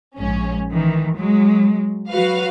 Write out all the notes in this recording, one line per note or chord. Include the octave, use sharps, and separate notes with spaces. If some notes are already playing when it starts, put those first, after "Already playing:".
A#1 G#2 C#4
D#3 E3
F#3 G#3
F#3 F#4 B4 F5